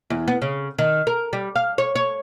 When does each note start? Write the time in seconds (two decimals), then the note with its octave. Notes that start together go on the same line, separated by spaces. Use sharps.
0.10 E2
0.28 B3
0.42 C#3
0.79 D#3
1.07 A#4
1.33 G3
1.56 F5
1.78 C#5
1.96 C#5